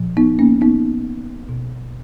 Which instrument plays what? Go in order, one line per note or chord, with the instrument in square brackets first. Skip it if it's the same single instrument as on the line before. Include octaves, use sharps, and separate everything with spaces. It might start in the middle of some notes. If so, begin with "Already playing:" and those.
Already playing: [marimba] A#2 F3
B3 D#4
A#3 C#4
B3 D#4
B2